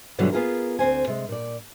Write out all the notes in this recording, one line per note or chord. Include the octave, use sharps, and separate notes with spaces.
G2 B2 D3 E3 F#3 G3
B3 F4 G#4 A#4
D2 C4 C5 G#5
C3 G#3
A#2 D5